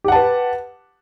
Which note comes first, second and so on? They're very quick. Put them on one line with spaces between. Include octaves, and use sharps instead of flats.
G4 F#5 A5 B4